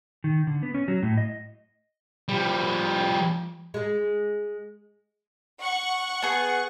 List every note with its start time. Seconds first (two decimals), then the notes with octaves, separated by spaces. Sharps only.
0.24 D#3
0.47 D3
0.63 B3
0.74 C#4
0.88 F#3
1.03 A2
1.17 D#5
2.29 F3 G3
3.74 G#3 G#4
5.62 F#5 C#6
6.22 B3 G#4